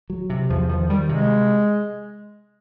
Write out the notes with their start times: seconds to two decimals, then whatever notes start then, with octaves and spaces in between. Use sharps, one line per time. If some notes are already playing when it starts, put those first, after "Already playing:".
0.10 F#3
0.30 C3
0.50 E2 F3
0.69 D#3 F3
0.90 D#3 G3
1.09 C3 G#3